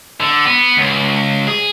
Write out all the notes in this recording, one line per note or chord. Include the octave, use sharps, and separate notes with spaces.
D3
B3
C#2
G#4